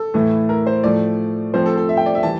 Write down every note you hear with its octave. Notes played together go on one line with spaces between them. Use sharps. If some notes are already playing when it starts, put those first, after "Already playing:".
Already playing: A4
A2 E3 A3 E4
A#4
C5
A2 F3 A3 D5
F3 A3 C4 C5
A4
A4
E5
G5
D5
E5
E3 G3 A5